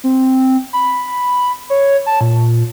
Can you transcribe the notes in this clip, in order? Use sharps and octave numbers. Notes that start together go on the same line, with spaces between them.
C4
B5
C#5
A5
A#2